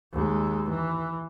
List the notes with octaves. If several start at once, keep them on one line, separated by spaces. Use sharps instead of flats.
D#2 G#3
E3